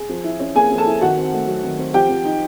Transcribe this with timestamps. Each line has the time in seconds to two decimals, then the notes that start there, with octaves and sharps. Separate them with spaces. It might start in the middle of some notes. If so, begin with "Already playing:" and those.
Already playing: G#4
0.09 F3
0.24 E4
0.40 C#4
0.55 A#3 G#4 G#5
0.71 F3
0.78 A4 A5
0.86 E4
1.01 D#3 F#4 F#5
1.17 C4
1.33 A3
1.48 F#3
1.64 D#3
1.79 C4
1.94 F3 G4 G5
2.10 F3
2.25 D#4